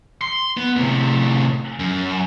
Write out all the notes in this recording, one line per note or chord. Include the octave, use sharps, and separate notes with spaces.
C6
B3
A2 C3
F#2